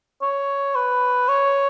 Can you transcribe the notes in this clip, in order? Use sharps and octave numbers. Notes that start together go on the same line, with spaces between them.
C#5
B4
C#5